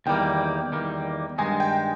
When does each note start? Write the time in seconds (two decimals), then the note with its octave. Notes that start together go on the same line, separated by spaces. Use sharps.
0.06 E2 D#3 G3 A#3 G5
0.72 E2 D#3 G3 A#3
1.38 G2 D#3 G#3 D#4 G#5
1.60 G5